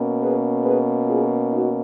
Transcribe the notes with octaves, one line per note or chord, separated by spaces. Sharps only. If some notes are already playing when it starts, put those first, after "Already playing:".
Already playing: B2 A#3 C#4
G#4 B4
G#4 B4
F4 G#4
D#4 F#4